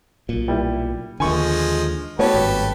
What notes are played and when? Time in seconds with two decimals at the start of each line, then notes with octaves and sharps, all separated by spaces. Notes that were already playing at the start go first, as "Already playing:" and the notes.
0.29 B1 A#2
0.48 G3 E4
1.20 D#2 D3 F3 G#3 G#5 C#6
2.19 A3 B3 F#4 G4 A4 B4 C#5
2.34 G#1 G2